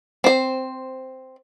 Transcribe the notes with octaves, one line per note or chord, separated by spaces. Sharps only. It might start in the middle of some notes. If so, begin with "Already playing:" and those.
C4 C5